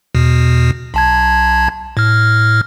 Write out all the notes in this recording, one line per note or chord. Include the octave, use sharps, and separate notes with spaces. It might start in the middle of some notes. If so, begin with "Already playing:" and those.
E2 B2
B1 A5 G#6
A2 F6